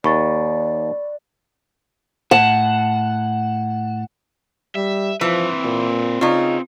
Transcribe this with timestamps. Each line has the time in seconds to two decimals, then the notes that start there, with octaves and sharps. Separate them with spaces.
0.04 D#2 D5 B5 C#6 A6
2.31 A2 F#5 A5
4.76 G3 E5
5.21 E3 F3 C4 B4
5.65 A#2
6.21 C#3 D#4 F4